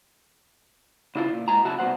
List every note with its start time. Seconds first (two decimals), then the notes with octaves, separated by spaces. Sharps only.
1.16 C#3 E4 F4
1.32 A#2
1.48 G#2 F#4 G#5 A#5
1.65 B1 C#3 E4 F#4 A5
1.78 C2 B2 D#3 C5 F#5